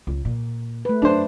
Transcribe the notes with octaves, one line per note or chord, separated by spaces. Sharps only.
C#2
A#2
A3 B4
F#2 D4 C5